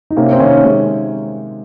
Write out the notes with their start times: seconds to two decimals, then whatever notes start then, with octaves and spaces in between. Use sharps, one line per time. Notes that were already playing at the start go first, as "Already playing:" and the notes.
0.11 D#4
0.16 C3 A#3 C#4
0.32 C4
0.40 D#3 A#3 C#4
0.64 G#3